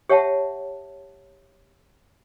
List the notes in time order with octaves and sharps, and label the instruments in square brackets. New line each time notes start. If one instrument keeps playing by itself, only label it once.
[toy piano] G4 C#5 E5 F#5 A5